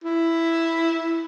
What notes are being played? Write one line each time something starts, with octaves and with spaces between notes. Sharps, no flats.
E4